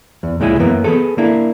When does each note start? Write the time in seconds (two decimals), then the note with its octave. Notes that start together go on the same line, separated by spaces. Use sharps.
0.23 E2
0.40 C#2 A#2 G#3 E4 G#5
0.59 F#2 E3 A#3 B3
0.84 B3 G#4 A4
1.18 A#3 D4 E4